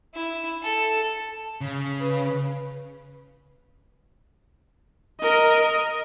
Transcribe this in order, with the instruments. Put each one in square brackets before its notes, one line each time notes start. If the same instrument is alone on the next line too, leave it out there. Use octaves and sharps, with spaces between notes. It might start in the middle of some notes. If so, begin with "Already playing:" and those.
[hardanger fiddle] E4
A4
[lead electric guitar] C#3
[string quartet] B4
[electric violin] A#4 D#5